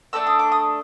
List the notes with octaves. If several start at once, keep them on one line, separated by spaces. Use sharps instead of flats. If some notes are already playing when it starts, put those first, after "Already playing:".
A3 D4 F#4 A4 E6
D#6
D6
D#6